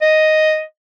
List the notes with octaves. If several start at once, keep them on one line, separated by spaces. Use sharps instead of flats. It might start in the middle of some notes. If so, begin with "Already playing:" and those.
D#5